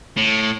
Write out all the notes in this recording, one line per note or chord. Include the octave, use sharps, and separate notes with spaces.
A2